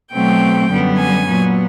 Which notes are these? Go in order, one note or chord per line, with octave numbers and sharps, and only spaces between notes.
B2 F#3 A3 C4 G5
F#2 D3 G3 B3
G#5
A#2 F#3 B3